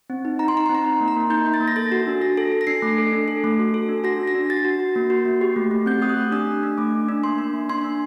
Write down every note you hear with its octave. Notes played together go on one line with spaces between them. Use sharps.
C4
D#4
D#4 A#5
C6
D#4 A#5
C4 C6
A#5
D#4 C6
A#3
A#5
A#3
D#4 G6
A#3
A6
A#3
A#6
A4 A6
F#4
D4
F#4 A#6
A4
A4
A#6
D4 C7
A3
A4
D4
A4
A3
F#4
A4
D4
F#4 A#6
D4
A#6
D4
F#4 A6
F#4
F#4
A#3
F#4
A#3
G4
A3
A3
C4 G6
G4 D#6
F#6
A3
D4 D#6
A3
D4
A3 D6
D4
D4
A#3 C6
D4
A#3
D4 C6
D4